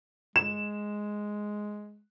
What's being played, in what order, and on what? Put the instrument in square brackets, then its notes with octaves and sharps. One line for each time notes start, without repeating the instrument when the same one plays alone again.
[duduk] G#3 [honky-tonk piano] E7